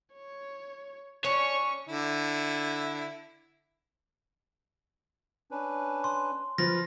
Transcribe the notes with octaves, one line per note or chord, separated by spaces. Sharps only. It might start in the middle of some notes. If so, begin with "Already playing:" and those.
C#5
C#4 D4 C#5 C#6
D3 E4
C#4 D4 B4
C6
F3 B4 F6 A#6